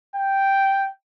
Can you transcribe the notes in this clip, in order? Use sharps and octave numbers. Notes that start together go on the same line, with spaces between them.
G5